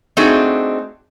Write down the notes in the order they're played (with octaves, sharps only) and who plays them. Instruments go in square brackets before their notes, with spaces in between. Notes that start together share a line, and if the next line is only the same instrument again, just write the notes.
[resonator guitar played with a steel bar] A3 C4 D4 D#4 F#4 G#4